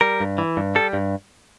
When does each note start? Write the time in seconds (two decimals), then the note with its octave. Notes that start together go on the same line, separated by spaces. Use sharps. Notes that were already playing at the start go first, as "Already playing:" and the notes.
0.01 G3 A#4
0.20 G2
0.38 E3
0.57 G2
0.75 G3 A4
0.93 G2